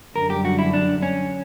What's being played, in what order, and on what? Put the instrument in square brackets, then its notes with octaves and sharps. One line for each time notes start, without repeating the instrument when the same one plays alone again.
[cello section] F#2 D3 G3 [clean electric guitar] A#4
[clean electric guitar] G4
F#4
E4
D4
C#4